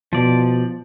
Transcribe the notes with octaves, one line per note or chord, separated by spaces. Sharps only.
B2 F3 D5